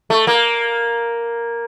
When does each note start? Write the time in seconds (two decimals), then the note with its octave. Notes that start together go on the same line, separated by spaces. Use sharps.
0.10 A3
0.27 A#3